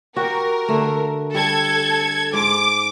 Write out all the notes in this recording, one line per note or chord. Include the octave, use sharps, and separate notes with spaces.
F#4 G4 A#4
D3 A3
G3 A4 G#6
G#2 D6